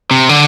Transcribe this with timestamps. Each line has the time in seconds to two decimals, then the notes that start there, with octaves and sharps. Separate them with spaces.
0.11 C3
0.29 D3